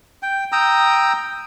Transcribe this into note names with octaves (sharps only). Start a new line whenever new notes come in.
G5
G5 A#5 D#6 E6